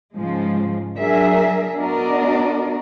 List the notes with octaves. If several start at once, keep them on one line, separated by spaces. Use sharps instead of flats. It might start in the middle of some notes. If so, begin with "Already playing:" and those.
G#2 C#3 F3 G#3
F#3 D4 G#4 A#4 E5
B3 D4 F#4 A#4 D5 D#5